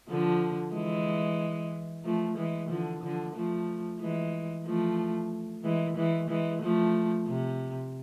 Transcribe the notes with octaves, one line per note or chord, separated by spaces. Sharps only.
D3 F3
E3 G#3
F3 A3
E3 G#3
D3 F3
D3 F3
F3 A3
E3 G#3
F3 A3
E3 G#3
E3 G#3
E3 G#3
F3 A3
C3